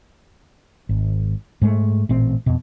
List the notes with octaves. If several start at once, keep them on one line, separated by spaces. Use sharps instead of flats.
G#1
G#2 G#3 A3
A1 A#2 C4
F2 B2